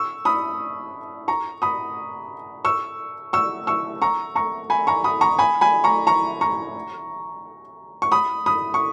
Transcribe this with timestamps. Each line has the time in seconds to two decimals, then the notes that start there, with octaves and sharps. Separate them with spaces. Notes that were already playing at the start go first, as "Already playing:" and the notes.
Already playing: C#6 E6
0.25 B5 D#6
1.28 A#5 C#6
1.62 B5 D#6
2.65 C#6 E6
3.33 C#6 E6
3.67 C#6 E6
4.02 A#5 C#6
4.35 A#5 C#6
4.70 G#5 B5
4.87 A#5 C#6
5.04 B5 D#6
5.21 A#5 C#6
5.39 G#5 B5
5.61 G#5 B5
5.84 A#5 C#6
6.07 A#5 C#6
6.41 A#5 C#6
8.02 C#6
8.12 B5 D#6
8.46 B5 D#6
8.74 C#6